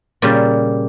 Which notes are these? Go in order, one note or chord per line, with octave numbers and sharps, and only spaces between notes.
A#2 C#3 G3